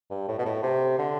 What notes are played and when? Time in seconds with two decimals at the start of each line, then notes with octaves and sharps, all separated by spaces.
0.10 G2
0.28 A2
0.39 B2
0.45 A2
0.63 C3
0.99 D3